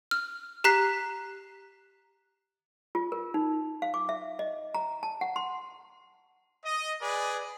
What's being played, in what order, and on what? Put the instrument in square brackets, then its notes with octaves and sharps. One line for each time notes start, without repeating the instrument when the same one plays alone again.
[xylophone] F6
G4 A#5 F#6 B6 C7
[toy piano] F4
A#4
D#4
F5
D6
E5
D#5
A#5
A5
F#5
C6
[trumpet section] D#5
G#4 B4 D5